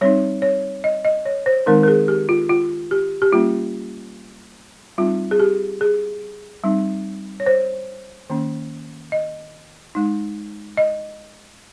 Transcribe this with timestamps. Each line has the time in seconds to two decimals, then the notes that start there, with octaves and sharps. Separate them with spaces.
0.01 G3 C4 D#4 C#5
0.42 C#5
0.84 D#5
1.05 D#5
1.25 C#5
1.46 C5
1.66 D#3 G#3 C4 D#4 A#4
1.83 A#4
1.88 G#4
2.08 G4
2.29 F4
2.50 F4
2.91 G4
3.22 G4
3.33 G3 A#3 C#4 F4
4.98 G3 C4 D#4 F4
5.31 G#4
5.40 G4
5.81 G#4
6.64 G3 C4 D#4
7.40 C#5
7.46 C5
8.30 D#3 A#3 C#4
9.12 D#5
9.95 G#3 D#4
10.77 D#5